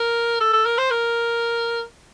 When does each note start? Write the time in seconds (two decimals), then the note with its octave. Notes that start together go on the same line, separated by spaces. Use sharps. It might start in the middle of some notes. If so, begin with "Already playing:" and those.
Already playing: A#4
0.40 A4
0.53 A4
0.66 A#4
0.78 C5
0.91 A#4